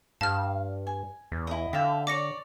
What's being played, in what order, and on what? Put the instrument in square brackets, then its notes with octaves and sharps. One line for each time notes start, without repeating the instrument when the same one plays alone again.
[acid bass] G2 [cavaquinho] F5 [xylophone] A5 F6
[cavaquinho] G#5
[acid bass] E2
[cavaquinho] E4 D#5
[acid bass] D3 [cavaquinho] E5 F5 G5
[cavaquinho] C#5 D5 [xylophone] D6 A#6 C#7